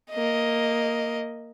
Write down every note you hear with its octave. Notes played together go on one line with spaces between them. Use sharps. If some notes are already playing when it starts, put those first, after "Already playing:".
A#3 D#5